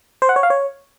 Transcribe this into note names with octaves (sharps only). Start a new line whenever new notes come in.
C5
F#5
C#5
F5
C#5